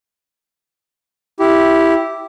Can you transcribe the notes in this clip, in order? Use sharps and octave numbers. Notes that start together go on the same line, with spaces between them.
E4 G4